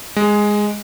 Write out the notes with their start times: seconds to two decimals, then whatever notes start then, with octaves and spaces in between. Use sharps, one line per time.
0.16 G#3